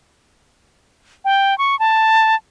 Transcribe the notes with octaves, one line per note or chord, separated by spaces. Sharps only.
G5
C#6
A5